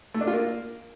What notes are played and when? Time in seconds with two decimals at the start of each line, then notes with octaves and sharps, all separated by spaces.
0.14 A3
0.21 D4
0.27 F4
0.34 A#3